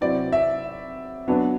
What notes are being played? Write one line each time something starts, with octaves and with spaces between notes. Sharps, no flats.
C3 F#3 C4 E4 D5
E5
F#3 B3 D4